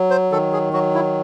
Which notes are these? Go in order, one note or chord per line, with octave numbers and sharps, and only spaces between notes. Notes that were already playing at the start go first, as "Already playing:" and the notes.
Already playing: F#3
C5
D#3 A4
G#4
F#3 F#4
E4